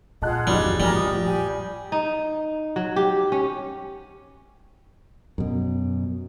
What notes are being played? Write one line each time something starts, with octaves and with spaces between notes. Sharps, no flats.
A#2 F4 G#4 D#5 F#5 A5 F#6
F#1 D#2 E3 F#3 G3 D#4
A#1 A2 G3 A#4 G#5
D#6
F2 G4 G#5
D#4
F#3
G4
C#4
F#2 B2